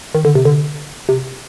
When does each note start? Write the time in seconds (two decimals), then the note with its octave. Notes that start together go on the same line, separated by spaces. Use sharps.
0.15 D#3
0.25 D3
0.35 C3
0.45 D3
1.09 C3